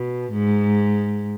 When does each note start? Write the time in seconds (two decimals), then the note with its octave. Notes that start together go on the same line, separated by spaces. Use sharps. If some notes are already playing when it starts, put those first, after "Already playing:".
Already playing: B2
0.32 G#2